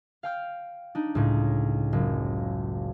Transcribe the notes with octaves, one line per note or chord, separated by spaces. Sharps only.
F5 G5 F6
D4 D#4
C#2 A2
F#1